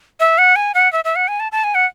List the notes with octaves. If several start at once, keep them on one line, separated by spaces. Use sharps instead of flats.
E5
F#5
G#5
F#5
E5
E5
F#5
G#5
A5
A5
G#5
F#5